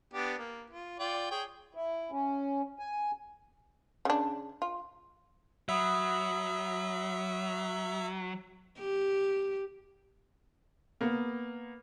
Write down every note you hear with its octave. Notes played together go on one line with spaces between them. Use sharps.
B3 D4 G4
A#3
F4
F4 D5 G5
G#4 C#5 G5
E4
C#4
G#5
C#3 D4
F4
F#3 E5 F#5 B5 D#6
G4
A#3 B3